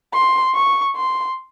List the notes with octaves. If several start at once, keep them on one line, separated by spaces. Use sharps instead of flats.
C6
C#6
C6